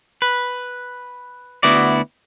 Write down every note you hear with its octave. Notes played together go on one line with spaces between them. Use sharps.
B4
D2 B3 E4 F#4 D5